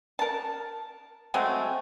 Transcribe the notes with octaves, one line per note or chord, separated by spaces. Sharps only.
A#4 A5
F#3 G#3 A3 C4